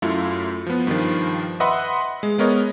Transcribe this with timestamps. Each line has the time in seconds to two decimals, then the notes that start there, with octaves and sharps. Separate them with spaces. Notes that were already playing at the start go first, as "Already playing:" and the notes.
0.02 F#2 A3 E4 F4
0.66 F3 B3
0.87 G2 D#3 F3
1.60 B4 D#5 E5 F#5 B5 C6
2.23 G#3
2.38 G#3 B3 A#4 C#5 D#5